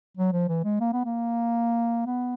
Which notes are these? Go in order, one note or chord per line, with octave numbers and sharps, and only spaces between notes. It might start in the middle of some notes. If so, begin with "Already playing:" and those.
F#3
F3
E3
G#3
A#3
B3
A#3
B3